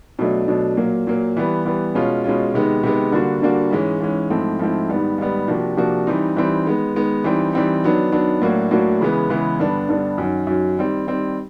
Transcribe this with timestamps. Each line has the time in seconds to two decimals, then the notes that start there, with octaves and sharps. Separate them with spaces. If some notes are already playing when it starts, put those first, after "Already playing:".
0.19 B2 F#3 A3 D4
0.48 B2 F#3 A3 D4
0.77 A#2 F#3 A#3
1.07 A#2 F#3 A#3
1.37 E3 G3 B3
1.65 E3 G3 B3
1.95 B2 G#3 C#4 F4
2.24 B2 G#3 C#4 F4
2.54 C3 D#3 G#3 B3
2.84 C3 D#3 G#3 B3
3.12 D3 G3 A#3 D4 F#4
3.42 D3 G3 A#3 D4 F#4
3.71 G#2 E3 G#3 C#4
4.01 G#2 E3 G#3 C#4
4.30 G#2 F3 A3 C4 E4
4.59 G#2 F3 A3 C4 E4
4.89 G#2 D#3 G3 B3
5.18 G#2 D#3 G3 B3
5.48 C3 F3 A#3 D4 F#4
5.77 C3 F3 A#3 D4 F#4
6.07 E3 G3 C4 D#4
6.37 E3 G3 C4 D#4
6.65 D#3 G#3 B3
6.94 D#3 G#3 B3
7.24 E3 G3 C4 D#4
7.53 E3 G3 C4 D#4
7.83 D#3 F#3 B3 D4
8.12 D#3 F#3 B3 D4
8.42 A2 F#3 A#3 D4 F#4
8.71 A2 F#3 A#3 D4 F#4
9.01 C#3 E3 G#3 B3
9.29 C#3 E3 G#3 B3
9.59 G2 D3 G3 B3 D4
9.89 G2 D3 G3 B3 D4
10.18 F#2 D#3 F#3
10.47 F#2 D#3 F#3
10.76 D#3 G3 C4
11.07 D#3 G3 C4